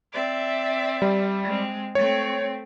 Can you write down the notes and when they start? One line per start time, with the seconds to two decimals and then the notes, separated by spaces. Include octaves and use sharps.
0.12 C4 D5 E5
1.02 G3
1.45 G#3 C4
1.95 A3 C4 C#5